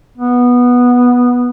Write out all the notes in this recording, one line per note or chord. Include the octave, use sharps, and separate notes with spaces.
B3